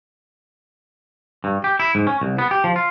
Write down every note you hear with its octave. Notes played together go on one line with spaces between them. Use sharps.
G2
G4
E4
G#2
C#4
C2
B3
G4
F3
F4